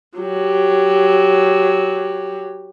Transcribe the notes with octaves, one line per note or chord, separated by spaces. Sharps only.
F#3 G4